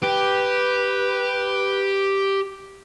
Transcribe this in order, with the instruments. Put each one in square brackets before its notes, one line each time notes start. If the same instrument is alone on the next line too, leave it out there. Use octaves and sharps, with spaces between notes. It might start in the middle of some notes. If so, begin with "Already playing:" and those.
[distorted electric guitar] G4 [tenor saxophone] B4